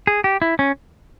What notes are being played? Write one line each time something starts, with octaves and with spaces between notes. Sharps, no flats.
G#4
G4
E4
C#4